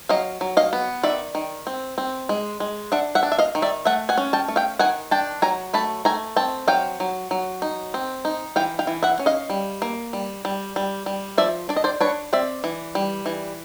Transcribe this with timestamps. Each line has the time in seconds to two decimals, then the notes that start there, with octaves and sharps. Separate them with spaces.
0.09 F#3 D#5 F5
0.41 F#3
0.57 D#5 F5
0.73 B3
1.03 D#3 D5 E5
1.35 D#3
1.67 C4
1.98 C4
2.29 G#3
2.60 G#3
2.92 D4 E5 F#5
3.15 E5 F#5
3.23 D4
3.32 E5
3.39 D#5 F5
3.55 D#3
3.62 D5 E5
3.85 A3 E5 F#5
4.09 F#5 G#5
4.18 C#4
4.33 G5 A5
4.48 A3
4.56 F5 G5
4.79 D#3 F#5 G#5
5.11 D4 G5 A5
5.42 F#3 G#5 A#5
5.74 A3 A5 B5
6.05 A3 G#5 A#5
6.36 C4 G5 A5
6.68 F#3 F5 G5
7.00 F#3
7.31 F#3
7.62 D#4
7.94 C4
8.25 D#4
8.56 E3 F5 G5
8.79 F5 G5
8.87 E3
9.03 E5 F#5
9.19 C#4
9.26 D#5 F5
9.50 G3
9.82 A#3
10.13 G3
10.45 G3
10.76 G3
11.06 G3
11.38 F3 D5 E5
11.69 D4 D5
11.77 D#5
11.84 C5 D5
12.01 D4 B4 C#5
12.33 C4 D5 E5
12.64 E3
12.95 G3
13.26 E3